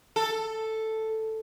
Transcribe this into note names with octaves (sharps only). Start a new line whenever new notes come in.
A4